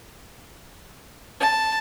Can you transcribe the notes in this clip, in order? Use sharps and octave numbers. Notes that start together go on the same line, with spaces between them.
A5